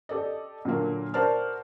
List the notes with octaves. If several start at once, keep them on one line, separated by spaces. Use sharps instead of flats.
G4 A4 D5 D#5
A#2 D3 F#3 A#3
F#4 A#4 C5 D5 A5 F6